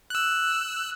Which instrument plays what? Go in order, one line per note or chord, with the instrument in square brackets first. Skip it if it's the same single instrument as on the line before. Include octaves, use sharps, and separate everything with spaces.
[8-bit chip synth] E6 F#6